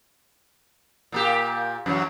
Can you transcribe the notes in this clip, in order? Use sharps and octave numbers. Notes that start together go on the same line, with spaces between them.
A#2 A#3 G4
F#2 E3 F#3